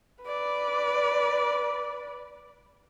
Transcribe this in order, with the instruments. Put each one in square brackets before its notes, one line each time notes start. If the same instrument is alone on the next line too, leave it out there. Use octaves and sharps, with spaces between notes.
[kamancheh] B4 D5